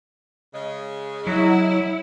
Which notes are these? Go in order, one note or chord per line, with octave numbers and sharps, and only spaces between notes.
C#3 G#3
F#3 E4